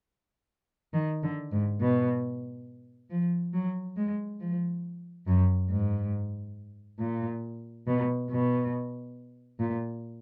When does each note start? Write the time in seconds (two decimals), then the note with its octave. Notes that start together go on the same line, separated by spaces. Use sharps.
0.94 D#3
1.23 D3
1.52 G#2
1.80 B2
3.11 F3
3.53 F#3
3.97 G#3
4.40 F3
5.27 F#2
5.70 G#2
7.00 A#2
7.86 B2
8.30 B2
9.59 A#2